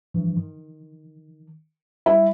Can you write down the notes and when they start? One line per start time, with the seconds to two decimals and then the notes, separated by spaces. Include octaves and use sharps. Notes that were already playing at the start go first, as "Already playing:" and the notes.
0.14 G2 E3 F3
0.37 D#3
2.06 G3 E4